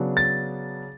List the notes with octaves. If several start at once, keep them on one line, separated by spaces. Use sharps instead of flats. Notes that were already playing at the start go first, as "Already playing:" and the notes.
Already playing: C#3 F#3 B3 D4
A6